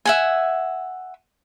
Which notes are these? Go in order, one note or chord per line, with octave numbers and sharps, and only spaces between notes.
E5 F#5 G#5